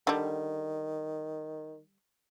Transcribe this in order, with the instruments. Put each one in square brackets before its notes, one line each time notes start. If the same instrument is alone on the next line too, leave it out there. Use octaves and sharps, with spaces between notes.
[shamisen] D3 G3 [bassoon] D#3